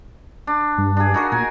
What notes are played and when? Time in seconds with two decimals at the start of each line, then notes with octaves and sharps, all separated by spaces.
0.47 D4
0.78 G2
0.97 D4 G#4
1.14 D#4 F#4 A#4
1.32 A#2 G#5